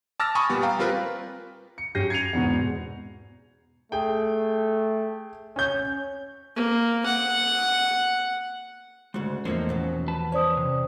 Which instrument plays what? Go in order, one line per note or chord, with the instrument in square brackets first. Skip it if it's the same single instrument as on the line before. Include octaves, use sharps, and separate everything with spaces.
[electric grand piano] A5 D6 E6 F6 A6 A#6
G#5 B5 C#6 D#6
A#2 G3 B3
F5 G5 A#5
G3 C4 F4 A#4 B4
[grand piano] C#7
F#2 G4 G6 A#6 C7 D#7
G#6 C7 C#7 D#7 F7
E2 G#2 B2
[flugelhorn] A3 [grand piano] G#4 G5
[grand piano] C#4 G6 [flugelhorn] C#5
[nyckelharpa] A#3
F#5
[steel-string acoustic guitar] D2 G#2 C#3 [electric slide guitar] G#3 F#4
[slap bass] E2 F3 [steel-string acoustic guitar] A2 A#3 D#4 [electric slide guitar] C#4 C5 C#5
[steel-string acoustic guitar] D#2 B2 F#3
[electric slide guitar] B4 A5
[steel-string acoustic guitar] C#4 [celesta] C5 D5 D#6
[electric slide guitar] C3